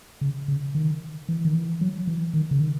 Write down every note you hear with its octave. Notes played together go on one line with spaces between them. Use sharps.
C#3
C#3
D#3
E3
D#3
E3
F#3
E3
D#3
C#3
D#3